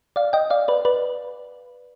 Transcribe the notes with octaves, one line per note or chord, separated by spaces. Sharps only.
D5 F5
D#5 G5
D5 F5
B4 D5
B4 D5